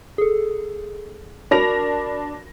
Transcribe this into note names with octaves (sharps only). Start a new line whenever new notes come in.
G#4 A4
D4 F#4 A#4 B5 A#6 F7